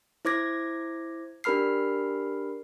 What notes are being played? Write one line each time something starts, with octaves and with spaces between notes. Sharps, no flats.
E4 C5 D6 G#6 A#6
D4 G4 A#4 B5 F6 C7